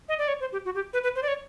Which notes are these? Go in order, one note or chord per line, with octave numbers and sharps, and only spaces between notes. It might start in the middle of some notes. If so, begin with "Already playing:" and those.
D#5
D5
C#5
C5
G4
F#4
G4
B4
B4
C5
D5
C#5